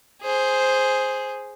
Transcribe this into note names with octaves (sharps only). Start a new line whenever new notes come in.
G#4 C5